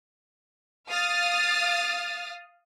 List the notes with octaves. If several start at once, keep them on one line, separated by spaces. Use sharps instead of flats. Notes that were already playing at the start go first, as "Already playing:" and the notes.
F5 D#6 F6 A6